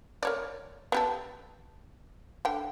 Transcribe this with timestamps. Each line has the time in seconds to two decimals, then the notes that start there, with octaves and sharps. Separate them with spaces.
0.23 A#4 C#5 D5
0.92 B3 G4 A4
2.45 D3 G5